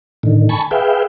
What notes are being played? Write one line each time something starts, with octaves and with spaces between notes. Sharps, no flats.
A2 D3 D#3
G#5 A5 B5 C#6
G#4 B4 E5 F5 G5